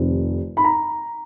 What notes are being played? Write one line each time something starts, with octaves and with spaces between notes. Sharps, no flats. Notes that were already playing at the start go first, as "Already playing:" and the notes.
Already playing: F1 F2 C3 D#3
B5
A#5